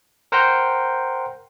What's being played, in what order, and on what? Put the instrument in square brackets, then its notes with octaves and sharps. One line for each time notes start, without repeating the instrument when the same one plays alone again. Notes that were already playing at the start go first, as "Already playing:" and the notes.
[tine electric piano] A#4 C5 F#5 G5 A#5 C6